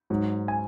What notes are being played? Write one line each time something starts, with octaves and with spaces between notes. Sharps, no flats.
G#2 F#3
G#5